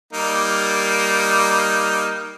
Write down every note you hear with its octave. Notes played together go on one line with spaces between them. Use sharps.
G3 A#3 D#4